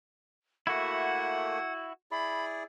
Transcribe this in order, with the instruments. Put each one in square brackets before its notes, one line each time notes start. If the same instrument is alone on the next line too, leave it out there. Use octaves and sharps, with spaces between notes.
[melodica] A3 A#3 [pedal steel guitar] E4 F#4 [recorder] F#5
[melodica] E4 G#4 D5 [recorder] B5